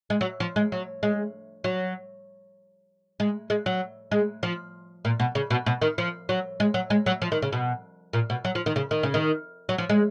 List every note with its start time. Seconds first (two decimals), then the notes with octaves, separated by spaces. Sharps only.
0.10 G#3
0.21 F#3
0.40 F3
0.56 G#3
0.72 F#3
1.03 G#3
1.64 F#3
3.20 G#3
3.50 G#3
3.66 F#3
4.11 G#3
4.43 F3
5.05 A#2
5.20 B2
5.35 C#3
5.50 B2
5.66 B2
5.82 D#3
5.98 F3
6.29 F#3
6.60 G#3
6.74 F#3
6.90 G#3
7.06 F#3
7.22 F3
7.32 D#3
7.42 C#3
7.53 B2
8.13 A#2
8.30 B2
8.45 F#3
8.55 F3
8.66 D#3
8.76 C#3
8.91 D#3
9.03 C#3
9.14 D#3
9.69 F#3
9.78 F3
9.89 G#3